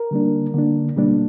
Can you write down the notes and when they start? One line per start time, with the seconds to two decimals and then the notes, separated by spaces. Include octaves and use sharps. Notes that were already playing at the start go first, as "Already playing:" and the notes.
Already playing: A#4
0.11 D3 G3 A#3 D4
0.54 D3 A#3 D4
0.97 B2 G3 A#3 D4